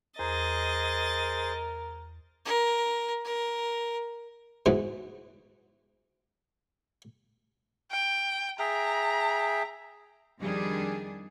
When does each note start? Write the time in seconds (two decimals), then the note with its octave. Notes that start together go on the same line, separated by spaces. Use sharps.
0.19 E2 G#4 A#4 C5 D#5 A#5 A6
2.45 A#4
3.25 A#4
4.66 G#2 B2 E3
7.91 G5
8.59 G#4 E5 G5 A#5
10.40 F2 D#3 G3 D4 G#4